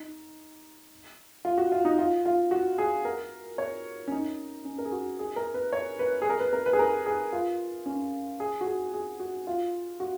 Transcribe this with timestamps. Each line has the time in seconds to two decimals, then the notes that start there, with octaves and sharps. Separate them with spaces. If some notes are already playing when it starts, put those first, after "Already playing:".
Already playing: D#4
1.45 F4
1.58 F#4
1.72 F4
1.85 D#4
1.98 F4
2.26 F4
2.51 F#4
2.78 G#4
3.05 A#4
3.58 C#5
4.08 C#4
4.12 D#4
4.65 C#4
4.78 A#4
4.85 G#4
4.92 F#4
5.19 G#4
5.36 A#4
5.54 B4
5.73 C#5
5.99 B4
6.22 G#4
6.30 A#4
6.40 B4
6.53 A#4
6.66 B4
6.73 G#4
6.79 A#4
7.06 G#4
7.33 F4
7.86 C#4
8.40 G#4
8.61 F#4
8.67 G#4
8.94 G#4
9.20 F#4
9.47 F4
10.00 F#4